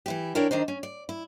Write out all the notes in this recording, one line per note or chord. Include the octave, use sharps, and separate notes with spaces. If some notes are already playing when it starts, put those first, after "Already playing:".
E3 E4 G4
D4 E4 A#4 C#5 D5 G5
D#3 D4 D#4 C5
C#4
D5
E4